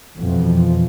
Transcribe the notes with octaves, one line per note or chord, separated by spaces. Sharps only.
F2 B2 E3 F3